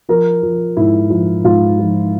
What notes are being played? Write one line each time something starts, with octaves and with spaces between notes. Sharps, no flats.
F3 A#4
F3
G#2 E4
F3
G#2 F4
F3